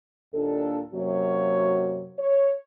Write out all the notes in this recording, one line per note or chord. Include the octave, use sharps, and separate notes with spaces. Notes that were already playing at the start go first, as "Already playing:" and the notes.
D#2 A#2 D4 A4
F#2 C3 F#3 A#3 F#4 C#5
C#5